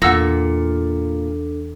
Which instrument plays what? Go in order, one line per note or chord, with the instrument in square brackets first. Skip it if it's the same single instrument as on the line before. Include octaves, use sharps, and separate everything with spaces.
[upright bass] E2 [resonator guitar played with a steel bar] A#2 [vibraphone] D4 A4 [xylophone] F#5 E6 A#6